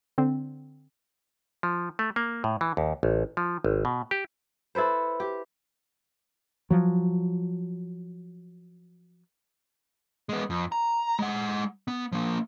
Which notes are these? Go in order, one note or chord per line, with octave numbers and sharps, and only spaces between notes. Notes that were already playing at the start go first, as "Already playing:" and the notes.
D3 C4
F3
A3
A#3
A2
E3
D#2
A1
F3
G#1
B2
G4
E4 A4 B4 C5
G4
F3 F#3
G#3 B3
F2
A#5
G#3 F#5
B3
F3 A#3